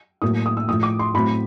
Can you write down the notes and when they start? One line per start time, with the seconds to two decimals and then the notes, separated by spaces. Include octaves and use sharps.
0.22 A2 F#3 A#3 D#6
0.46 D#6
0.57 E6
0.68 A2 F3 A3 D#6
0.83 D6
0.99 C6
1.14 A2 F#3 A3 C4 B5